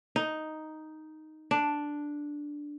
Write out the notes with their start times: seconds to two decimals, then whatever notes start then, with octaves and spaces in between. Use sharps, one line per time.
0.16 D#4
1.51 D4